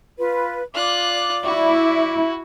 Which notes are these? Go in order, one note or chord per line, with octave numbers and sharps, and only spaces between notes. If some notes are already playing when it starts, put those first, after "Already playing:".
F4 B4
F4 D5 D6 F#6
E4 F#4